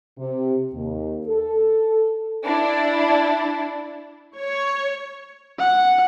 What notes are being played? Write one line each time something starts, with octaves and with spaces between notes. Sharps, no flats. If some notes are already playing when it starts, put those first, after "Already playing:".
C3
D#2
A4
D4 E4
C#5
F#5